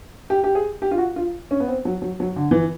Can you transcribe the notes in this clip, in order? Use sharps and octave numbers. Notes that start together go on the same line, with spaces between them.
G4
G4
G#4
G4
F4
F#4
F4
C#4
B3
C4
F#3
F#3
F#3
D3
E3